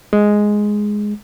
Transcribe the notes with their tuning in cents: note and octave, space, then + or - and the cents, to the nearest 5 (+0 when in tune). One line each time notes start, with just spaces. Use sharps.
G#3 +0